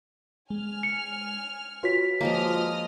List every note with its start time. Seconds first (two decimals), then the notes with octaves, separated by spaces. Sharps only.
0.50 G#3 G#5 F6
0.83 C#7
1.83 F4 F#4 B4 C#5 B6
2.21 F3 G#3 A#3 D#5 D#6 F6